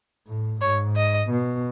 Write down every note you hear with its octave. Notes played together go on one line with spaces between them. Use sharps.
A2
G#2 C#5
D#5
B2